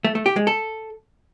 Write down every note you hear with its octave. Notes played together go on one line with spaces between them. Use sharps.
A3
A3
G4
G#3
A4